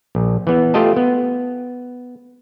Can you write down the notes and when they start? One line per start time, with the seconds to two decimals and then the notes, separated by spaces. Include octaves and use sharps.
0.15 A#1
0.47 E3 B3
0.74 A3 F4 G4 D#5 A5
0.96 B3